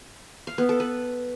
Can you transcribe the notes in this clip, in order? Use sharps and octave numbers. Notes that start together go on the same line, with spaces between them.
F5
B3
A4
B4